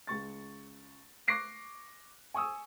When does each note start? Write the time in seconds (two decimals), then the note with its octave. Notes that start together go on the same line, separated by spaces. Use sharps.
0.07 C#2 C#6 A6
1.28 C#6 D6 F#6 A#6 C7 D7
2.34 G#5 C#6 D#6 E6